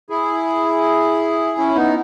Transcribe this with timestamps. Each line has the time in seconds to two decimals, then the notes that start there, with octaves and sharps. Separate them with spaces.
0.10 E4 G#4
1.58 C#4 E4
1.75 B3 D#4